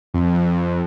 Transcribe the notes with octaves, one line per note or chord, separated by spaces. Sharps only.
F2